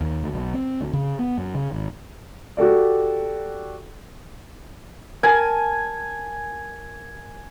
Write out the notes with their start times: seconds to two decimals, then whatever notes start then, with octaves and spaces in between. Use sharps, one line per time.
0.01 D#2
0.23 D2
0.34 B1
0.54 C4
0.81 D2
0.93 C#3
1.19 B3
1.38 F#2
1.55 C#3
1.73 G#1
2.57 F#4 G4 A4 D5
5.23 A#4 G#5 A5